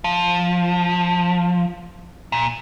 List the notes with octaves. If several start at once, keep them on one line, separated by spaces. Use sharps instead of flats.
F3
A#2